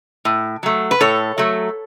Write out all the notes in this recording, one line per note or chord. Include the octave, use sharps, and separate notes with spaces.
A2
F#3 A3
B4
A2 A4 C#5
F#3 A3